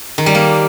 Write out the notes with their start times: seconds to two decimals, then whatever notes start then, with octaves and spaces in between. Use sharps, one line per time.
0.18 D#3
0.26 G3
0.35 A#3